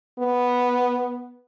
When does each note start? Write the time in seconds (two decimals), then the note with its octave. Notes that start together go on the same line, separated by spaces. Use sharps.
0.19 B3